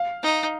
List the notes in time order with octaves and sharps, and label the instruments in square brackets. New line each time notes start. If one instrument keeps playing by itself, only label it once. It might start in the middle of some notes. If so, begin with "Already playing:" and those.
Already playing: [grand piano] F5
[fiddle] D#4